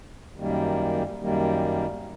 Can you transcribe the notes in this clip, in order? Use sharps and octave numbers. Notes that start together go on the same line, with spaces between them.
F#2 D#3 G3 A#3
F#2 D#3 G3 A#3